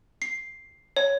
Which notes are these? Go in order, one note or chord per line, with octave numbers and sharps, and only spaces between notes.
C7
C#5